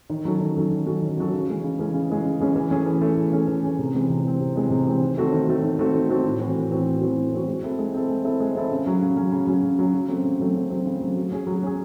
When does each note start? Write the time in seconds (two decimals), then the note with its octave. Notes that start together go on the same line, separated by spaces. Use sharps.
0.10 D#3
0.25 F#3 C#4 F#4 A4
0.40 D#3
0.56 F#3 C#4 F#4 A4
0.71 D#3
0.86 F#3 C#4 F#4 A4
1.02 D#3
1.17 F#3 C#4 F#4 A4
1.33 C#3
1.48 E3 G#3 C#4
1.64 C#3
1.79 E3 G#3 C#4
1.94 C#3
2.10 E3 G#3 C#4
2.25 C#3
2.40 E3 G#3 C#4
2.56 E3
2.71 A3 C#4 G#4
2.86 E3
3.01 A3 C#4 G#4
3.17 E3
3.32 A3 C#4 G#4
3.48 E3
3.63 A3 C#4 G#4
3.79 C3
3.94 E3 G#3 C4
4.10 C3
4.25 E3 G#3 C4
4.40 C3
4.56 E3 G#3 C4
4.70 C3
4.87 E3 G#3 C4
5.01 D#3
5.17 A3 C4 F#4 A4
5.32 D#3
5.48 A3 C4 F#4 A4
5.63 D#3
5.79 A3 C4 F#4 A4
5.94 D#3
6.09 A3 C4 F#4 A4
6.25 A2
6.40 E3 C4 F#4
6.55 A2
6.71 E3 C4 F#4
6.86 A2
7.01 E3 C4 F#4
7.17 A2
7.32 E3 C4 F#4
7.47 G#3
7.63 C4 E4 A4
7.79 G#3
7.94 C4 E4 A4
8.09 G#3
8.24 C4 E4 A4
8.40 G#3
8.55 C4 E4 A4
8.71 C#3
8.86 F#3 C#4
9.02 C#3
9.16 F#3 C#4
9.32 C#3
9.47 F#3 C#4
9.63 C#3
9.79 F#3 C#4
9.94 C#3
10.08 F#3 A3 C4
10.24 C#3
10.40 F#3 A3 C4
10.55 C#3
10.70 F#3 A3 C4
10.86 C#3
11.01 F#3 A3 C4
11.16 F#3
11.32 C#4 G#4
11.47 F#3
11.63 C#4 G#4